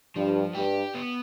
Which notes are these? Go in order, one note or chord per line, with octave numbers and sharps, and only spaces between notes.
G2 F3
G2 G4
B3